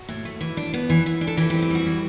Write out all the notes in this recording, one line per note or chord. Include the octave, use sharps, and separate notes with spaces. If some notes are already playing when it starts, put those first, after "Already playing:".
Already playing: F#4
A2
A3
E3
D4
B3
E3
E3
D4
A4
E3 G4
G4
C4
G4
G3 F#4
E3